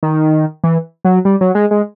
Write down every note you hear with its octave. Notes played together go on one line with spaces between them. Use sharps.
D#3
E3
F#3
G3
F#3
G#3
G#3